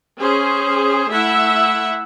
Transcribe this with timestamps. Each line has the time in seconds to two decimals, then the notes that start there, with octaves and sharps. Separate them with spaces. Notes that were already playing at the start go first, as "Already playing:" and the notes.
0.19 C#4 G#4 C5
1.10 A3 E4 E5 F#5